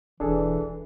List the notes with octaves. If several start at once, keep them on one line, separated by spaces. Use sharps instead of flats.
E1 E3 D4 G#4 A4